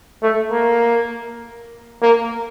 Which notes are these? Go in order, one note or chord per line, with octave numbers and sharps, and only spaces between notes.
A3
A#3
A#3